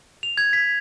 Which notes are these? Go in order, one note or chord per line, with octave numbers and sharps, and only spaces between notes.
F7
G#6
B6